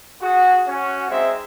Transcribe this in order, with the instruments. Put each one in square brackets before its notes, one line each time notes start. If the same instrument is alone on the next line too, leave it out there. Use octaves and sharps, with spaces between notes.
[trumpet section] F#4 G#4
C#4 F#4
G#3 C4 D#4 E5